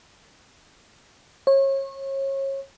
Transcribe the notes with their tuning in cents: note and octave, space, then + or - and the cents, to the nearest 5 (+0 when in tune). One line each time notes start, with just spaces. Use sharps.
C#5 -30